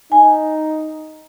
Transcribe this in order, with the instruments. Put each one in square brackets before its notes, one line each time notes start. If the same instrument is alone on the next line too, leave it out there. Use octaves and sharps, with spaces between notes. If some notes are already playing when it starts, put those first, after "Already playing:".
[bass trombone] D#4 [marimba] G#5